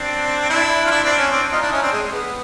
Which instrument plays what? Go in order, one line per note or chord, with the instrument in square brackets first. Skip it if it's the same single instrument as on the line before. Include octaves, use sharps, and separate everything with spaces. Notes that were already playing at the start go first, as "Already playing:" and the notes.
Already playing: [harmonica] C4 D4
D4 E4
F4
D4 E4
C4 D4
C#4
C4 D4
D#4 F4
D4 E4
C#4 D#4
C4 D4
G#3
G#3
B3